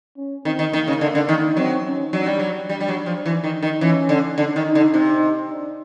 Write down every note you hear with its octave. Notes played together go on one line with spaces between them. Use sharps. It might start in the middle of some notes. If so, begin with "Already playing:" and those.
C#4
D#3 C4
D#3
D#3 A#3
C#3
D3
D3
D#3
F#3 C4
C#4
F#3 D4
G3
F#3
G3 D4
G3
F#3
F3
E3
D#3
D#3
E3 C#4
D3
D3 D4
D#3
D#4
D3
C3 D#4
D4